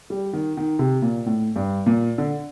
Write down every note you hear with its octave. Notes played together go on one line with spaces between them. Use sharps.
G3
D#3
D#3
C3
A#2
A2
G2
A#2
D3